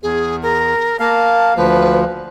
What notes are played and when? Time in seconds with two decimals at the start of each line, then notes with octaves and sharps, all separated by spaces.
0.03 E2 G#4
0.43 A#4
1.00 A#3 F5 A5
1.57 D2 F3 B4